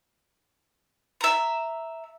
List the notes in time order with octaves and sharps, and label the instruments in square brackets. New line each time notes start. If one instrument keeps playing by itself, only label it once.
[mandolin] E5 A#5